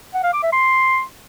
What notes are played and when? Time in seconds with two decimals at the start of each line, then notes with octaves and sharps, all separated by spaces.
0.14 F#5
0.24 F5
0.33 D6
0.43 E5
0.52 C6